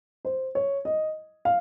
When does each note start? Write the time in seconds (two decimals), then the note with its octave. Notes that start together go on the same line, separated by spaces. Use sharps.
0.25 C5
0.55 C#5
0.85 D#5
1.45 F5